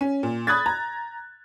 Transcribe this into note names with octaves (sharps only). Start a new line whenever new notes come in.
C#4
A#2
B5 D#6 F#6 G#6 A6
A#5